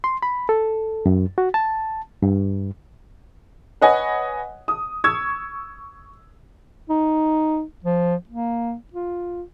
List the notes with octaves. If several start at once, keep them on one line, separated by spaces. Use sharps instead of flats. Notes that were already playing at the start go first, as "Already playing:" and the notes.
C6
B5
A4
F#2
F#4
A5
G2
B4 C#5 D#5 F#5 G#5
D#6
C#6 E6 G#6
D#4
F3
A#3
F4